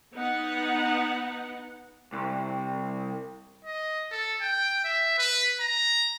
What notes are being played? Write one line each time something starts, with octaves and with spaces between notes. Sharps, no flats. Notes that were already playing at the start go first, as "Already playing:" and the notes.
B3 D#4 F#5
C2
D#5
A4
G5
E5
B4
A#5